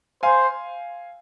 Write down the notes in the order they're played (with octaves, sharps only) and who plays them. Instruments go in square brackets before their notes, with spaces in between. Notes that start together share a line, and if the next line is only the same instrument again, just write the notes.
[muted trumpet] C5 [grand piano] F5 G#5